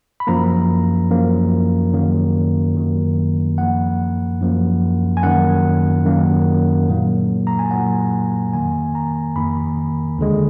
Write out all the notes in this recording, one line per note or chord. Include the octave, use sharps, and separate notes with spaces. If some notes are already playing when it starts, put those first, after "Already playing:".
B5
F#2 F3 A#3 A#5
F#2 F3 A#3
F#2 D#3 F#3 A#3
F#2 D#3 F#3 A#3
F#2 F3 A#3 F#5
F#2 F3 A#3
G#5
F#2 D#3 A#3 F#5
F#2 D#3 A#3
A#2 F#3 A#3
A#5
G#5
A#2 F#3 A#3 F#5
F2 D#3 A#3 G#5
A#5
F2 D#3 A#3 B5
D#2 D3 G#3